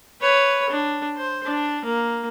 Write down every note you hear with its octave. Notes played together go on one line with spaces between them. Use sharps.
B4 C#5
D4
C5
D4
A#3